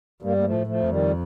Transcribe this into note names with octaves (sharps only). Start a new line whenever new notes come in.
G2 G3 A#3
A#3
F3 A3
A2
F3 A3
F2
D#3 G3